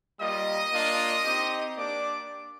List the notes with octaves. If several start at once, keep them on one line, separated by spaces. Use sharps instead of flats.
G3 A#3 F4 D#5 D#6
A#3 D4 F4
C4 D#4 G4
A#3 D4 G4 D5 D6